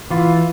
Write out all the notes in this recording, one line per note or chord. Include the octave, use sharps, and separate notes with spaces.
E3 F4